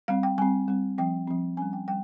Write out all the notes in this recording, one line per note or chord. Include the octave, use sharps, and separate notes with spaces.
G3 C4 F5
G5
G3 C4 G#5
G3 C4
F3 C4 G5
F3 C4
G3 C#4 G#5
G5
G3 G5